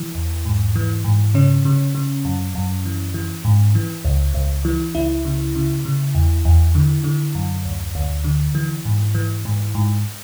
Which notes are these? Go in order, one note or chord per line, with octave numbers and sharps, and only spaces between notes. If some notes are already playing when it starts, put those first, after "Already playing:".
Already playing: E3
E2
G#2
E3
G#2
C#3 C#4
C#3
C#3
F#2
F#2
E3
E3
G#2
E3
C#2
C#2
E3
C#2 E4
C#3
C#3
C#3
E2
E2
D3
D3
F#2
D2
D2
D3
E3
G#2
E3
G#2
G#2